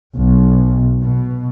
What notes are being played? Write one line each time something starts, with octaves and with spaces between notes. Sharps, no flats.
B1
B2